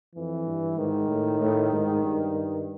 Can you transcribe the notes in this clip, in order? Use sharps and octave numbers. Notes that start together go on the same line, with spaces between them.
F2 E3
G2
G#2 D#3
A2
A2
G#2
G2